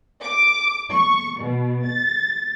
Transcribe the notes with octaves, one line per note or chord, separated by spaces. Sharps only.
D6
C#6
B2
A6